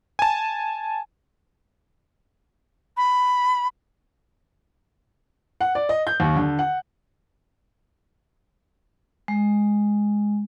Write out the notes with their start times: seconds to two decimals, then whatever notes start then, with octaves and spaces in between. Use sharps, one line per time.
0.19 G#5 A5
2.97 B5
5.61 F#5
5.75 D5
5.89 D#5
6.07 G6
6.20 D#2
6.36 D3
6.59 F#5
9.28 G#3